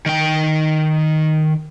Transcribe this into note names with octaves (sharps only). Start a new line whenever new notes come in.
D#3 G5